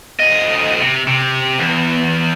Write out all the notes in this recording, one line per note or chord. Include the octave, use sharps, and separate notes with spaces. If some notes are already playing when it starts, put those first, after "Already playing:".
D2 D#5
C3
C3
E2